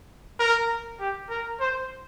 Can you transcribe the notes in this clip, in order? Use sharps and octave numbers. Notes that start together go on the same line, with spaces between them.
A#4
G4
A#4
C5